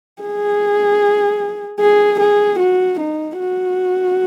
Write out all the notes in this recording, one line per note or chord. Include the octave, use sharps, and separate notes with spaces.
G#4
G#4
G#4
F#4
D#4
F#4